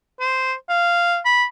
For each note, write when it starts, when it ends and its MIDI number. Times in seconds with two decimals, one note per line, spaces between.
0.20 0.54 72
0.69 1.20 77
1.26 1.45 83